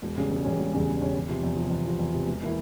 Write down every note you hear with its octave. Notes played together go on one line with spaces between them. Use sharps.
E1
E2 C#3 G3 C#4
E1
E2 C#3 G3 C#4
E1
E2 C#3 G3 C#4
E1
E2 C#3 G3 C#4
E2
C3 F3
E2
C3 F3
E2
C3 F3
E2
C3 F3
E1
E3 A#3 E4